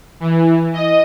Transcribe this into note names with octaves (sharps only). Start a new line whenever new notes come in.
E3
D#5